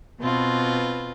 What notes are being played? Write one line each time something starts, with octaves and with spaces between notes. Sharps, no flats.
B2 C4 F4 B4